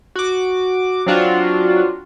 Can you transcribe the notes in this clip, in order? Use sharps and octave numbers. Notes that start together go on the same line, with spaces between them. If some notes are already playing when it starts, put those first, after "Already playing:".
F#4 D6
F#3 C4 D4 F4 F#4